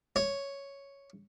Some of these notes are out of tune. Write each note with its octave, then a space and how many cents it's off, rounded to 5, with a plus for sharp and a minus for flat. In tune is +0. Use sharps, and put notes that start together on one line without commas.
C#5 +0